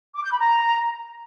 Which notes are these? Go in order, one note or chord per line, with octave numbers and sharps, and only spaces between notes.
D6
G6
B5
A#5